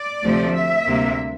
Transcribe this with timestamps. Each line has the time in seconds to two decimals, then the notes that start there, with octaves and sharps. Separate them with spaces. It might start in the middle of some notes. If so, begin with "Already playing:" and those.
Already playing: D5
0.22 D2 C3 F3 A3
0.54 E5
0.86 D2 C3 G3 A#3